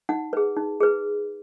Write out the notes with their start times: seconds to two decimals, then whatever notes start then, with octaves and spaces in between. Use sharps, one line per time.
0.09 D#4 F#5
0.33 G#4 B4
0.56 D#4
0.80 G#4 B4